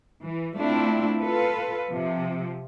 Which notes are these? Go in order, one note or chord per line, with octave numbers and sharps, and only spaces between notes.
E3
A3 C4 D4 E4 F4
F4 A4 B4
C3 F3